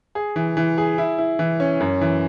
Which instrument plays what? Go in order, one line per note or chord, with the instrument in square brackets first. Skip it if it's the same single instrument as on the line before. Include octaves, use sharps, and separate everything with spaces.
[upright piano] G#4
E3
E3
G#4
E4
E4
E3
C#4
F#2
E3